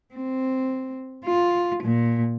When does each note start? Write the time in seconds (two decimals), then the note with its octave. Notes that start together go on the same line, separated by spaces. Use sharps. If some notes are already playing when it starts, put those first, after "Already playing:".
0.15 C4
1.26 F4
1.83 A#2